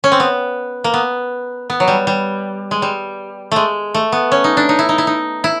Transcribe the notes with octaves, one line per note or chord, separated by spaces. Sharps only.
C#4
C4
B3
A#3
B3
B3
F#3
G3
G3
G#3
G3
G#3 A3
A3
B3
C#4
D#4
D4
D#4
E4
D#4
E4
D#4
E4